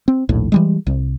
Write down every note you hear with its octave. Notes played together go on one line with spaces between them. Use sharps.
C4
A#1 D#2 A2
E3 G3 G#3
C2